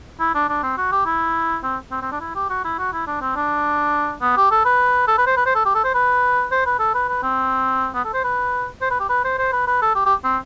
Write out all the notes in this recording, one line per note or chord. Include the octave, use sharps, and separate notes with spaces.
E4
D4
D4
C4
F#4
G4
E4
C4
C4
C4
D4
E4
G4
F#4
E4
F#4
E4
D4
C4
D4
B3
G4
A4
B4
A4
B4
C5
B4
C5
A4
G4
A4
C5
B4
C5
B4
A4
B4
B4
C4
B3
A4
C5
B4
C5
B4
G4
B4
C5
C5
B4
B4
A4
G4
G4
C4